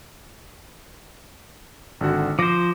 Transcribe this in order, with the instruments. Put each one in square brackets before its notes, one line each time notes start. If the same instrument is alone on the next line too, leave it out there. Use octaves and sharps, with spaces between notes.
[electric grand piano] G#1 D3 F#4
[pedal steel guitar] F3 C5 [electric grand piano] D6 A#6